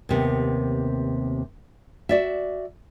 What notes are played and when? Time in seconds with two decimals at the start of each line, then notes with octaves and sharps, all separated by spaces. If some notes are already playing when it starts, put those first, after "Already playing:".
0.09 D#2 C3 B3
2.09 F#4 D5 E5